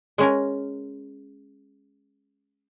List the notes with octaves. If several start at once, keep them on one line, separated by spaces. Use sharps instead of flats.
G#3 C#4 A#4